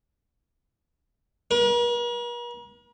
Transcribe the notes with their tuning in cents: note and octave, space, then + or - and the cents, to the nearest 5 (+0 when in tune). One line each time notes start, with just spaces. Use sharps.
A#4 +45